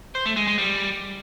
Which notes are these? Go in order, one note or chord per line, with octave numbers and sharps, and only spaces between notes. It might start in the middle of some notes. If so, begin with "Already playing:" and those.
C5
A3
G#3
G#3
G3